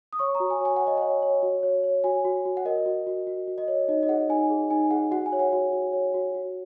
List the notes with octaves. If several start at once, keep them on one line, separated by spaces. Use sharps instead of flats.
D#6
C#5 C#6
A#5
F#4
G#5
C#5 G#5
C#5 F#5
D#5
C#5 F#5
C#5
F#4
C#5
C#5
F#4 G#5
F#4
F#4
F#5
A#4 D#5
F#4
F#4
F#4
F#4
D#5
C#5
D#4 D#5
D#5
G#4 F#5
D#4 G#5
G#4
D#4 G#5
G#4 F#5
F#4 F#5
G#5
C#5
F#5
F#4
F#4
C#5
F#4
F#4